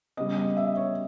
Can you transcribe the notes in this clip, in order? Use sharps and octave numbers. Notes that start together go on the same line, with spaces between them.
C#3 G3 B3 D#5
D#5
E5
C#5